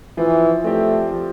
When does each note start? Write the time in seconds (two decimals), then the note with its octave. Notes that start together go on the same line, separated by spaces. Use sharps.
0.18 E3 F3
0.64 A3 C4 G4 D5
1.11 F3